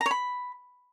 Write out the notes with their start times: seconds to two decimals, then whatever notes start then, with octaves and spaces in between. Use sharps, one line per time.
0.01 A#5
0.06 C#5
0.11 B5